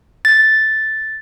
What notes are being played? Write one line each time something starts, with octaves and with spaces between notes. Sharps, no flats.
A6